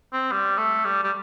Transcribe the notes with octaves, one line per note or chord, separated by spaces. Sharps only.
C4
G3
A3
G3
G3